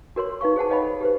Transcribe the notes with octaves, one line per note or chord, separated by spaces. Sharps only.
F#4 A#4 C#5 C6
D#4 B4 F5 C#6
G#4 C5 F#5 A5
B4 C#5 D#5 F5 G5 B5
A4
G4 B4 C5